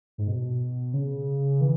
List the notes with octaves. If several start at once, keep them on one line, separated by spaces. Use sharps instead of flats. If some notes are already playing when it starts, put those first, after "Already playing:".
G#2
B2
C#3
E3